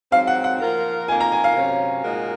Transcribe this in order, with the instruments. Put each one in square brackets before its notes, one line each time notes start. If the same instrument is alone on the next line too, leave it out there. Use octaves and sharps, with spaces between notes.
[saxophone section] G#2 F#3 C4 [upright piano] F5
[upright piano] F#5
F#5
[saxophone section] F3 A#3 F4 A#4
[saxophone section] F2 D#3 A#3 F4 A#4 [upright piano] G#5
[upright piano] A#5
G#5
F5
[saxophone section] C3 F#3 C#4
A#2 G#3 D#4 F#4 A#4